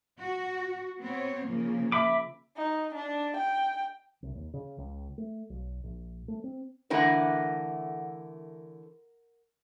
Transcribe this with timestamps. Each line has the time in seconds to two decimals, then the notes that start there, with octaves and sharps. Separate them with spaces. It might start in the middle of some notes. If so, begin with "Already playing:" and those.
0.20 F#4
1.00 B3 C4 C#5
1.46 C#3 F3 A#3
1.92 E5 B5 D6
2.57 D#4
2.95 D4
3.37 G5
4.22 C2
4.35 D#2
4.54 C#3
4.78 C#2
5.18 A3
5.50 B1
5.83 A#1
6.28 A3
6.44 C4
6.90 D3 E3 A3 A#4 F#5